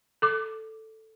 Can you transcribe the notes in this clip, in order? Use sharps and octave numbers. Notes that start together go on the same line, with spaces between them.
A4 D6